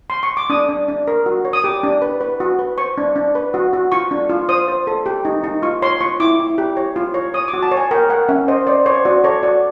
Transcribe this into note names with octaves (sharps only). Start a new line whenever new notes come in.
C6
C#6
D6
D4 D#6
D4
D4
A#4
F#4
C#5
D#6
G4 D6
D4
B4
B4
F#4
B4
C5 C#6
D4
D4
B4
F#4
F#4
F4 C#6
D4
F4
C5 D#6
C5
A4
G4
D#4
D#4
F4 C#6
C#5 C6
F4 C#6
E4 D6
E4
G4
C#5
F4
C#5
C#5 D#6
D6
F#4
A5
C#5
G#5
A#4 G5
A#4 F#5
C#4 E5
C5 D#5
C5 D5
C5 C#5
F#4 D5
A4 C#5
F#4 D5